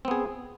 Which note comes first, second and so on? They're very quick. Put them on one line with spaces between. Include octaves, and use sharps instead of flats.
C4 B3 G#4